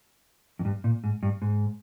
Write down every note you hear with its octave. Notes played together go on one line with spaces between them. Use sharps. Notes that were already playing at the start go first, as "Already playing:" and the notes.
F2
G2
A#2
G#2
G2
G#2